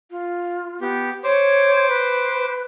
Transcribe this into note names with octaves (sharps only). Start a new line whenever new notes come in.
F4
B3 G4
C5 C#5 D6
B4